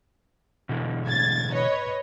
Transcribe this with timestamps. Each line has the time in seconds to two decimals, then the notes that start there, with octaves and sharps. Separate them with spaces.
0.69 B2 D3 E3
1.07 A1 G#6 A6
1.52 B4 C#5 D#5